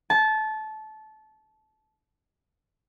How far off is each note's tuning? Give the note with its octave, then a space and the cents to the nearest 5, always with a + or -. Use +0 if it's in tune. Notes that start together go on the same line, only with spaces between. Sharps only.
A5 -20